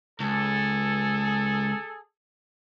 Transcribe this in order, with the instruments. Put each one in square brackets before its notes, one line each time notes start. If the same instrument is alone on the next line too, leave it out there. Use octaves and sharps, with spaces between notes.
[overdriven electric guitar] C#2 [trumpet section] G#4 A4